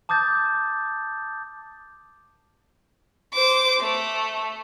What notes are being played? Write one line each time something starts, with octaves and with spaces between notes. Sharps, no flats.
A5 D6 D#6 G6 A6
C5 D6
A3